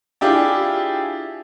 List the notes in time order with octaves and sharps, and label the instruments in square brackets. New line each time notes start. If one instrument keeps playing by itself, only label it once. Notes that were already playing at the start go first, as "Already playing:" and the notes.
[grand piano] D4 E4 F4 G4 G#4